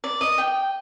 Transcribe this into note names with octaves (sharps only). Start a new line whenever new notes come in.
D5
D#5
G5